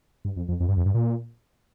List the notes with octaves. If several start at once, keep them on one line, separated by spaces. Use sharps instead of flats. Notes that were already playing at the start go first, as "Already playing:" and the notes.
G2
F2
F2
F2
G2
F2
G2
A#2